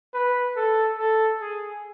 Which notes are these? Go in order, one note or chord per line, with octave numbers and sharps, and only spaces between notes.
B4
A4
A4
G#4